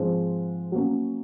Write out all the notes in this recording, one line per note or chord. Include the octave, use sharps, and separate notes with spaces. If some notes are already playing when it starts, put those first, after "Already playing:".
Already playing: G#2 F3 G#3 C4
F#3 A#3 C#4